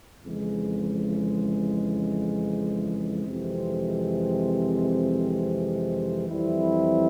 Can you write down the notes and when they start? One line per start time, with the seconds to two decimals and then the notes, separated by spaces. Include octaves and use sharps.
0.22 F2 C#3 E3 G#3
3.24 F2 C3 E3 G#3 C4
6.28 F2 E3 G3 C4 E4